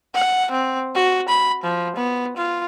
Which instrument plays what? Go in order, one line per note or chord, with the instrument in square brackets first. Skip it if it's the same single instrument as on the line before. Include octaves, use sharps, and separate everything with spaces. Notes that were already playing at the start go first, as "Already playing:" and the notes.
[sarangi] F#5
C4
F#4
B5
F3
B3
F4